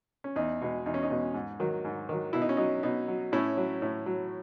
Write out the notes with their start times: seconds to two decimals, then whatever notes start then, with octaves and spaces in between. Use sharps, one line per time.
0.24 C#4
0.36 E2 D#4
0.61 B2 G#3
0.86 E2 D#4
0.94 C#4
1.03 D#4
1.10 B2 G#3
1.34 G#2
1.60 D#3 F#3
1.85 G#2
2.09 D#3 F#3
2.33 B2 E4
2.41 D#4
2.49 C#4
2.57 F#3 D#4
2.83 B2 D#4
3.08 F#3
3.32 A2 C#4 E4
3.57 F#3
3.82 A2
4.06 F#3